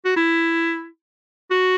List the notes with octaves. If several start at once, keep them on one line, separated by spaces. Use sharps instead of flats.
F#4
E4
F#4